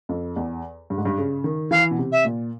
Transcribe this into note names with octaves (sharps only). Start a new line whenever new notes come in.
F2
E2
G2
G#2
G2
C#3
D#3
E3 F5
B2
C3
E5
A#2